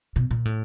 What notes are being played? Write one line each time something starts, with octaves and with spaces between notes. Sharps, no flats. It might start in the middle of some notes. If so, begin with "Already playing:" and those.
B2
A#2
A2